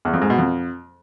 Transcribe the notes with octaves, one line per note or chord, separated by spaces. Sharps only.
E2
F2
G#2
B2
F2